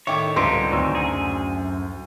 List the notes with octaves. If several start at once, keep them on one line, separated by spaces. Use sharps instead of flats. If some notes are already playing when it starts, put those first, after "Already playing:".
A2 D#3 C#5 E5 G5 D6
C#2 G2 D3 C4 D#4 G4 C5
D2 D#3 F#3 C4 D#4 E6
F#2 G#4